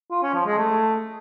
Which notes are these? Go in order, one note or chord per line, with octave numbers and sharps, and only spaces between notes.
F4
C#4
F3
G#3
A3